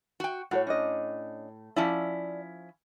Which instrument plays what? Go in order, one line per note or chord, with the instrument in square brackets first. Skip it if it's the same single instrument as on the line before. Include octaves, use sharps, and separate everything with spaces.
[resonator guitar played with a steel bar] F#4 G5
[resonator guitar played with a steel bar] A2 [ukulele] F#4 A#4 C#5
[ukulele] C#4 D4 D#5
[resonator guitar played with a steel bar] F3 C#4 E4 [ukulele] D5 A5